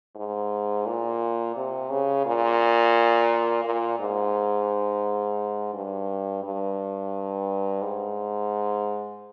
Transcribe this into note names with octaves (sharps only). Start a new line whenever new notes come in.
G#2
A#2
C3
C#3
A#2
A#2
G#2
G2
G2
G#2